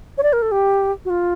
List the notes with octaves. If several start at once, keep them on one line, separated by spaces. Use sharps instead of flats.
C#5
D5
A#4
A4
G4
F#4
F4